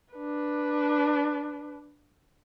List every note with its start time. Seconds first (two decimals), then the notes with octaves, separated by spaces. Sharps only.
0.15 D4 B4